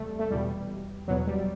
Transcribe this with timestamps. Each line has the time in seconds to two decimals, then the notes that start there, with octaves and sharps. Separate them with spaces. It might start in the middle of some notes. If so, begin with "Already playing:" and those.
Already playing: E2 C3 G3 A3
0.19 A3
0.31 E2 B2 G3
1.08 E2 B2 F#3
1.27 G3